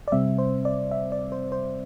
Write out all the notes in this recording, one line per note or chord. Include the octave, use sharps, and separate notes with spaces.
D5
C3 G3 C4 E5
C5
D5
E5
D5
C5
C5